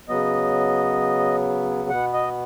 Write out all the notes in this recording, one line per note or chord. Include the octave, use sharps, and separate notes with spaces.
C#3 F#3 B3 D#5
B2 B3 F#5
D#5